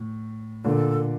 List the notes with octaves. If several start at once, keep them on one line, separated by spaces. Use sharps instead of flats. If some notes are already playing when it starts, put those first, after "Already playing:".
Already playing: A2
A#2 D3 A4